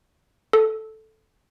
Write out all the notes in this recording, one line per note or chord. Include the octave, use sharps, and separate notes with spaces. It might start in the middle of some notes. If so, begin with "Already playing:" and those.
A4